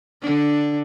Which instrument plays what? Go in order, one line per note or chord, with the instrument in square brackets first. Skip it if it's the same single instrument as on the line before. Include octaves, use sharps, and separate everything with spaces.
[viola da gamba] D3 D4